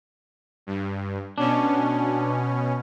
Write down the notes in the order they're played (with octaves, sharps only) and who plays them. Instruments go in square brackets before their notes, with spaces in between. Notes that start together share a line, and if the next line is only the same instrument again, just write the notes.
[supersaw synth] G2
[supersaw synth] B2 C#4 [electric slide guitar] D4